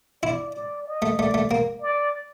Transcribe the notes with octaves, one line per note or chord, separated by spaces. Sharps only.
E4 D5
D5
D#5
A3
A3 D5
A3
A#3
D5